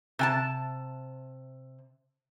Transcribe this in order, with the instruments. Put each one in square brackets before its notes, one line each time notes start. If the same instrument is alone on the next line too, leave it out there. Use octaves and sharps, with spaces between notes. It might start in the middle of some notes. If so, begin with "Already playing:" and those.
[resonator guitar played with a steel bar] C3 G#5 A5